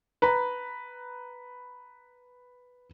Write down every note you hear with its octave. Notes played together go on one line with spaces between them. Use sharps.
B4 A#5 B5